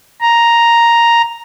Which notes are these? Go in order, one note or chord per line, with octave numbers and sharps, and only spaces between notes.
A#5